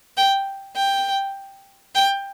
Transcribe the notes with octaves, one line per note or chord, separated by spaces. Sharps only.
G5
G5
G5